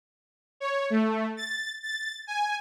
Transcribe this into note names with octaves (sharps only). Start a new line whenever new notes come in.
C#5
A3
A6
A6
G#5